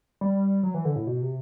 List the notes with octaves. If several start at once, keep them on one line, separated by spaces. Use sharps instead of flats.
G3
F#3
E3
D3
A2
B2
C3